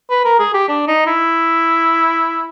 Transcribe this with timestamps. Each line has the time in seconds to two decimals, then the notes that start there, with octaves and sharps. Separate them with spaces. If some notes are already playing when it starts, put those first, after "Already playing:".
0.10 B4
0.25 A#4
0.39 G#4
0.54 G4
0.68 D4
0.88 D#4
1.06 E4